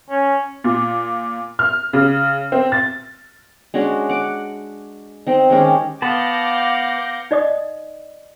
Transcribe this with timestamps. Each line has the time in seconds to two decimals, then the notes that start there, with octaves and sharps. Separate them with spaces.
0.10 C#4
0.64 A#2
1.59 F6
1.93 C#3
2.52 C4
2.72 A6
3.74 G#3 C#4 D4 F#4
4.09 F#5 D6
5.27 C4 D#4
5.50 D#3 G#3 C#4 G4
6.02 B3 F5 F#5 A5 B5 D6 G6 A#6
7.31 D#4 D5 D#5 D#6